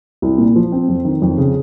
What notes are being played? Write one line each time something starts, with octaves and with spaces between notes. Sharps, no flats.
C2
A#2
F3
C4
F2
D#3
F2
C#3